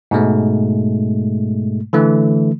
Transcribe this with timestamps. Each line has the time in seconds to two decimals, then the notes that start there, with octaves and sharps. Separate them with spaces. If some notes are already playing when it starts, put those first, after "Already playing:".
0.11 G#2 B2 G#3 A3
1.93 D3 E3 A3